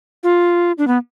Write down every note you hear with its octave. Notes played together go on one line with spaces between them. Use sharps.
F4
D4
B3